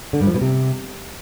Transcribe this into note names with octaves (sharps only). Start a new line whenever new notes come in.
D3
G2
F3
B2
C3